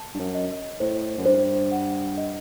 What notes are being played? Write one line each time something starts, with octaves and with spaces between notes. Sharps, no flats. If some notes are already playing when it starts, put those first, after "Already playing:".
Already playing: A5
G2
F#2
D#5
A2 C5
F#2
G2 C5
F#5
D#5